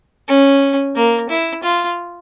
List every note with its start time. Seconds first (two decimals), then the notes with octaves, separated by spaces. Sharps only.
0.28 C#4
0.96 A#3
1.30 E4
1.63 F4